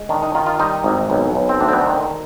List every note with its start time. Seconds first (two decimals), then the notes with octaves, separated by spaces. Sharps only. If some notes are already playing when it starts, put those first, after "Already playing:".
Already playing: G#3
0.09 D#3 D4
0.22 D#4
0.35 D#3 F4
0.46 F4
0.60 G3 D#4
0.84 G#1
1.10 B1
1.35 B1
1.49 C4
1.60 D2 D4
1.68 C4
1.73 B3
1.81 D4
1.86 D#3 C4